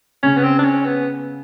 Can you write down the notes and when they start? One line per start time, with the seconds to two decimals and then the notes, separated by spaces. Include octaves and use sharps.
0.23 C#3 C#4
0.37 B3
0.44 C4
0.59 D4
0.65 C#4
0.86 B3